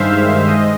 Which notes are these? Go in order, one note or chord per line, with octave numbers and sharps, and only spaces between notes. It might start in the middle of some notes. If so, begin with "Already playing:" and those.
Already playing: G2 D#3 G#3 C5 E5 F5
G#3 D#5